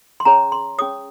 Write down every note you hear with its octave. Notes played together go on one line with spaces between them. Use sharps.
C6
C#4 G#4 C#5 A#5
C6
C#4 G#4 C#5 D#6